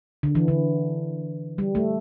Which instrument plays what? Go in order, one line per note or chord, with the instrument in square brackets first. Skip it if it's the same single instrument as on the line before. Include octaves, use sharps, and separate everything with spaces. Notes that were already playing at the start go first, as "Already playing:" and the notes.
[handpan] D3
E3
D3
G3
A3